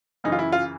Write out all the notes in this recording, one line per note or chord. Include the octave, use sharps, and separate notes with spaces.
F#2 C#3 E3 D#4
F4
E4
F4